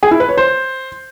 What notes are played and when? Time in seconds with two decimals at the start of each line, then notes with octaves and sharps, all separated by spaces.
0.03 G#4
0.11 E4
0.20 B4
0.29 C#5
0.37 C5